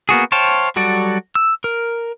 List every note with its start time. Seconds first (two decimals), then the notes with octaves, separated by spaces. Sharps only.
0.09 A#3 B3 F#4 G#4
0.32 C5 C#5 F5 G5 A5
0.76 F#3 G3 F#4 A4 D5
1.35 E6
1.64 A#4